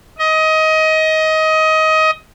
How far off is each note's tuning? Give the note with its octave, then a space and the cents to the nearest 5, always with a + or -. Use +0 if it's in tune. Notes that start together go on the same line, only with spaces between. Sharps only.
D#5 +20